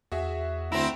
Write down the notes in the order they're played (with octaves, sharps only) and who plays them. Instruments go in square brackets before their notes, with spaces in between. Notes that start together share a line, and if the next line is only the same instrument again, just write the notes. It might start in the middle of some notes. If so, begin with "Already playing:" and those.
[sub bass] E2 [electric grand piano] F#4 G#4 E5
[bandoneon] D2 A#5 E6 [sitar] C4 E4